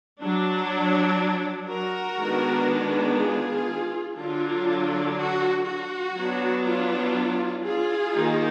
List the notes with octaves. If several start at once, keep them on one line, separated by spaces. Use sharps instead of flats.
F#3 D4
F#4 A#4
D#3 G#3 B3 D4
F4 G#4
D3 F#3 D4 F4
F#4
F#4
F#3 B3 D4
F4
F4 G#4
D#3 A#3 D#4